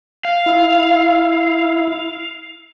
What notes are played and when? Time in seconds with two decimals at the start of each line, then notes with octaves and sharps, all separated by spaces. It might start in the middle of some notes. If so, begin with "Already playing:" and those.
0.25 F5
0.46 E4